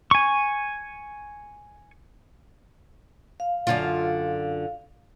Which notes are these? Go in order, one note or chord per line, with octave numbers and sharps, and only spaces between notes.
G#5 C#6
F5
F#2 D3 F4